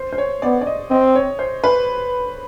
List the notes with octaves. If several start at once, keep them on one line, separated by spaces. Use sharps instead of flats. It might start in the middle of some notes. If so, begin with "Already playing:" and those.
Already playing: C5
C5
C#5
B3 D5
D5
D#5
C4 D#5
C#5
C5
B4